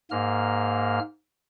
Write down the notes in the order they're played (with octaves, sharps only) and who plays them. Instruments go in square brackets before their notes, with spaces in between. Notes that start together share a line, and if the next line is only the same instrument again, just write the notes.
[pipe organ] G#2 A#3 F6